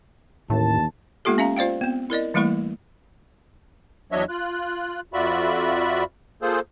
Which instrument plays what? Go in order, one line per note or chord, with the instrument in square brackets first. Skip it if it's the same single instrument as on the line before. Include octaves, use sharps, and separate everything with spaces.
[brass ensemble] A1 D#2 A5 [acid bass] A2
[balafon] G#3 A#3 B3 F4 G4 A4
C#4 E5 F5 A#5
F4 C5 D5 F5 G5
B3 C4
E4 A#4 D5 D#5
E3 G3 A3 A#3 E4 C#6
[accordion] E2 F#3 D4 C#5 D#5 E5
F4 F#6
F2 F4 F#4 D5 E5 B5
A#3 F4 G#4 A4 C5